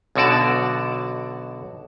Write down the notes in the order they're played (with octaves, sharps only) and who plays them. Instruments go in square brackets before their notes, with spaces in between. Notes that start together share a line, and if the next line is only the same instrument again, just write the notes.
[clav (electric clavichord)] B1 B2 D3 F#4 D5 A5